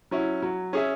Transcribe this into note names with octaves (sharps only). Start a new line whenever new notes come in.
F#3 C#4 E4
F#3
C#4 G#4 E5